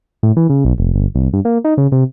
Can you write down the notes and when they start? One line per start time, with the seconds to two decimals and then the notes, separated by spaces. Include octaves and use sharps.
0.23 A2
0.37 E3
0.50 C#3
0.65 B1
0.78 F1
0.94 G1
1.15 C2
1.33 G2
1.45 A#3
1.64 D#4
1.78 C#3
1.92 C3